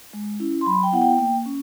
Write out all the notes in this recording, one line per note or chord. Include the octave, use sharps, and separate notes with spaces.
G#3
C#4 E4
C6
F#3 B5
G5
B3 E4 F#5
G5
A#3 G5
C#4